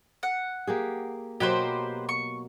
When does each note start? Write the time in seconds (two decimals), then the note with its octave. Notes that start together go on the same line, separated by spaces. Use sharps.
0.23 F#5
0.67 A#3 G4 G#4
1.40 B2 F#3 A#3 G4 B4 C5
2.09 C#6